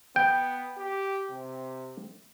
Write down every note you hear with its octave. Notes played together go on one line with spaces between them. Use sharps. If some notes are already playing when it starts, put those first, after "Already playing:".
B3 G5
G4
C3